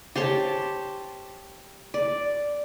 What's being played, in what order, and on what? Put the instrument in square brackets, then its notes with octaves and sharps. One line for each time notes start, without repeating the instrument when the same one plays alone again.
[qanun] G4 C5 C#5 A5
D5